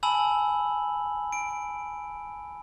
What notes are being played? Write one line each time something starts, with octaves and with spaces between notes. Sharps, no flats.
G#5 A5 B5 E6 F#7
D7